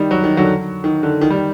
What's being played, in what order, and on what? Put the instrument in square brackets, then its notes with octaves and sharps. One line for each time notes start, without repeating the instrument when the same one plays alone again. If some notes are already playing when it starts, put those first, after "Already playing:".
Already playing: [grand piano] D#3 G3
F#3
D#3
D3 F#3
D#3
D3
D#3
G3